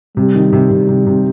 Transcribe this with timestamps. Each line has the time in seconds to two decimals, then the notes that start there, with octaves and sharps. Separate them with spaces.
0.17 C3 G3
0.35 D#3
0.53 C3
0.71 C3
0.89 C3
1.07 C3